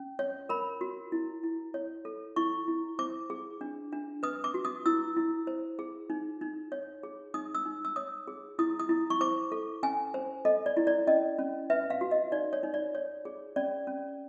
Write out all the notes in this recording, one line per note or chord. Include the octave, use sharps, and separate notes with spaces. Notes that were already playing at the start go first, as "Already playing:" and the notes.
Already playing: C#4
C#5
A#4 B5
F#4
E4
E4
C#5
A4
E4 C#6
E4
C5 D6
G#4
D4
D4
B4 D#6
D6
F#4
D#6
E4 E6
E4
C5
G#4
D#4
D#4
C#5
G#4
D#4 D#6
E6
D#4
E6
C#5 D#6
G#4
E4 D#6
D#6
E4
C#6
C5 D6
A4
C#4 G#5
C5
A4 D#5
D5
E4
D5
C#4 D#5
C#4
B4 E5
F5
F#4
D#5
D#4 D5
C#5
D#4
D5
C#5
G#4
C#4 D5
C#4